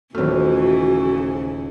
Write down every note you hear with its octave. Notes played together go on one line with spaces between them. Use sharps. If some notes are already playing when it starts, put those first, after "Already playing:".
D#1 C#3 E3 A3 C4 F#4 F6